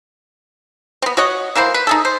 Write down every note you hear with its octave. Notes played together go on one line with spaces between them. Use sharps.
B3 C4
F#4 C#5 D#5 F#5
E3 A#3 E4 C5
B4
D#4 G#4 A4
C5